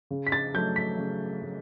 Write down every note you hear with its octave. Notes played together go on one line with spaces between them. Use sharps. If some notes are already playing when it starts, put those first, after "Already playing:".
C#3
B6
A6
F#3 A3 G6
B6
C#3
F#3 A3